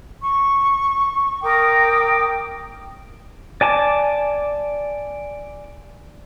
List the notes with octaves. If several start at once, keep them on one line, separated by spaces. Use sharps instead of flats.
C#6
A#4 G5 D6 D#6
D5 G#5 A5 D6